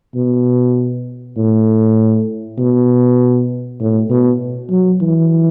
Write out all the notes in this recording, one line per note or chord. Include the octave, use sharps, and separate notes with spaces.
B2
A2
B2
A2
B2
F#3
E3